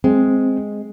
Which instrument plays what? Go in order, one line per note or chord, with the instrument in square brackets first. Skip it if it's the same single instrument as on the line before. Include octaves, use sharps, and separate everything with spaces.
[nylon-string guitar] G#3 [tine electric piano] C4